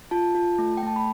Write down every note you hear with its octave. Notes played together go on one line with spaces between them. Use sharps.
F4 A5
F4
A3
G5
A3 A5
B5